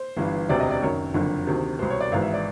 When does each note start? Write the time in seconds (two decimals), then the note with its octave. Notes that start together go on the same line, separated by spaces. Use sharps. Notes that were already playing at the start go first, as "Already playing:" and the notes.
Already playing: C5
0.17 G1 G2 E3
0.49 E1 D2 C3 D5
0.60 D#5
0.71 D5
0.82 F#1 F#2 D#3 C#5
1.14 F#1 F2 D3
1.47 D2 C3 D#3
1.79 C2 B2 C5
1.90 C#5
2.00 D5
2.12 G#1 G#2 E3 F5
2.22 E5
2.34 D5